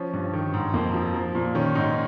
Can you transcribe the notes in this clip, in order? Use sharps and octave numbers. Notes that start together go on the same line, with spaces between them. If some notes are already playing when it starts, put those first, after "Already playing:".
Already playing: F3 C#4
G2
D#3
G#2
F2 A#3
F3
F3
A#2
D#3 C#4
G#2 D#4